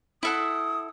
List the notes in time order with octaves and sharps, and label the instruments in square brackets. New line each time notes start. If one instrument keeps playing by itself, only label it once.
[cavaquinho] E4 A4 F#5 [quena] D#6